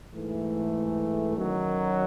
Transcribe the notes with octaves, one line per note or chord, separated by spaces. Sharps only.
G#2 E3 A3
F#2 D#3 F#3